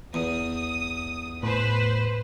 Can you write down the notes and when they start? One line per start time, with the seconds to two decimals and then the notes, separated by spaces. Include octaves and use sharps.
0.14 E2 D#6
1.43 A2 B4 C5